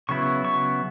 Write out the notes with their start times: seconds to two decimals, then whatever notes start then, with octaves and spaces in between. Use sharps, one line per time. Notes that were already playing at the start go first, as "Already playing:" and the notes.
0.09 C#3 F#3 B3 E4 C#6
0.45 C#6